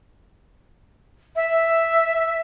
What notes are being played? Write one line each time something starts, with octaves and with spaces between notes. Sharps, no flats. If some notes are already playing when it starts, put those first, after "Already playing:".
E5